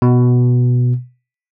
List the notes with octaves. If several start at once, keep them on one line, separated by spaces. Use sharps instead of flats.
B2